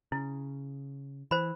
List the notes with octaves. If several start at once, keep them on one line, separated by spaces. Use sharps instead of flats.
C#3 E4
E3 C5 B5